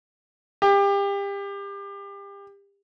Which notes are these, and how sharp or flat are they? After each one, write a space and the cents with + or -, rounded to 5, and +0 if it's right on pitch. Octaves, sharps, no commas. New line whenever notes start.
G4 +30